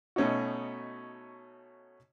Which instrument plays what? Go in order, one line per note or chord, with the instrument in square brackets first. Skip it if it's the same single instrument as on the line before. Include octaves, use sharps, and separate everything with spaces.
[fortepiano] B2 A3 C#4 D#4 F#4